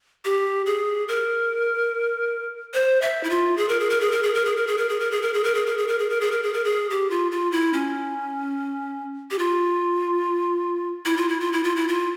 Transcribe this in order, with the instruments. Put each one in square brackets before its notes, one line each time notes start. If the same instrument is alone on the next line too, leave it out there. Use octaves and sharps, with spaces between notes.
[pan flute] G4
G#4
A#4
C5
E5
E4
F4
G#4
A#4
G#4
A#4
G#4
A#4
G#4
A#4
G#4
A#4
G#4
A#4
G#4
A#4
G#4
A#4
G#4
A#4
G#4
A#4
G#4
A#4
G#4
A#4
G#4
A#4
G#4
A#4
G#4
G4
F4
F4
E4
C#4
G4
F4
E4
F4
E4
F4
E4
F4
E4
F4